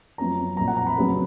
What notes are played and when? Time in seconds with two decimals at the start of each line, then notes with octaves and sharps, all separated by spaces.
0.18 F#2 F3 B3 A#5
0.57 B1 A#2 F3 A#5
0.68 F#5
0.77 A#5
0.87 B5
0.96 F2 C#3 F#3 B3